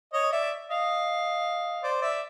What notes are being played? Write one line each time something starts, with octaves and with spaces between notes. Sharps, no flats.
C#5 D#5
D5 E5
D#5 F5
C5 D5
D5 E5